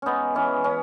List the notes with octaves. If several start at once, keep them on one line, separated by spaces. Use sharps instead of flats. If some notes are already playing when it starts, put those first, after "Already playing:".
G#3 B3 C#4 D#4
E3 C#4
C#4